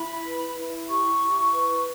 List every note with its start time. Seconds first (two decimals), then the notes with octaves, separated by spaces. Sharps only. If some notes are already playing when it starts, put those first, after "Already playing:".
Already playing: E4 B5
0.24 B4
0.57 E4
0.89 G4 C#6
1.22 E4
1.54 B4